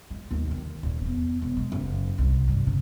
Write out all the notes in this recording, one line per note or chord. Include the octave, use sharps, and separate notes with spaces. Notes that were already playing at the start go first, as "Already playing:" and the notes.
G#3
D#2
D#3
D#1
E2
E1
G#3
F#1
C2
G2
C#3